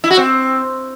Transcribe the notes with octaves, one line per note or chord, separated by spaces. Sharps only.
E4
F#4
C4